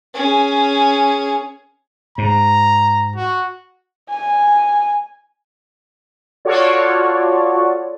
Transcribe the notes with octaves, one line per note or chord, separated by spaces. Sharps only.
C#4 G#4
G#2 A#5
F#4
G#5
F4 F#4 A4 C#5 D5